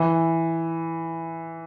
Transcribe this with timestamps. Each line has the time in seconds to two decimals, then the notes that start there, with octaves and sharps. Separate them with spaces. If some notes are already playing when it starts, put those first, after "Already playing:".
Already playing: E3